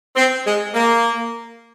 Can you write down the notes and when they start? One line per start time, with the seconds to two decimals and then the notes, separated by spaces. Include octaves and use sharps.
0.15 C4
0.46 G#3
0.74 A#3